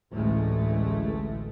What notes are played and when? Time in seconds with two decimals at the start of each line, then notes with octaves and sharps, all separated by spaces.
0.13 A1 D2 G#3 A3